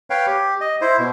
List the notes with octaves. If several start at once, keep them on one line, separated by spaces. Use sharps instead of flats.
B4 C#5 F5 G5
G4
D#5
E4 C5
B2